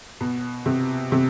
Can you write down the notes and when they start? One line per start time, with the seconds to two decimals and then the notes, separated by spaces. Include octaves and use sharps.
0.21 B2
0.66 C3
1.12 C3